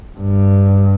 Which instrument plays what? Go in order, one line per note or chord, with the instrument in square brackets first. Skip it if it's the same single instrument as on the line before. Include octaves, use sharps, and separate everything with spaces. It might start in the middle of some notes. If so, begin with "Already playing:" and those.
[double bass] G2